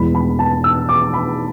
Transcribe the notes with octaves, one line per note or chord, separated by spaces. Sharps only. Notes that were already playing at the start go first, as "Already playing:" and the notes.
Already playing: E1 E2 B2 B5
B5
A5
E6
D6
B5